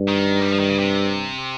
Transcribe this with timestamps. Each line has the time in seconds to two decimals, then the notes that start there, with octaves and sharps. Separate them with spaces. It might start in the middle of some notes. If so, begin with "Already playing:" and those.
Already playing: G2
0.09 D#3
0.41 G3
0.51 F3
0.59 D#3
0.69 C#3
0.78 C3